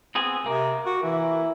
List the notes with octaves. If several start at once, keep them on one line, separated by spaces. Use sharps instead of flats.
B3 C4 G#4
C3 A#3 A#4
F#4
E3 E4